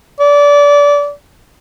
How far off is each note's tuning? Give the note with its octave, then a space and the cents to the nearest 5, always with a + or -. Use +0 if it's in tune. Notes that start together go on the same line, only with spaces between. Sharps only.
D5 -25